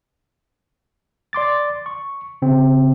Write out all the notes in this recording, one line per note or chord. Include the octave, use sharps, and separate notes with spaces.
D5 C6 D6 A6
C#6
C#3 C4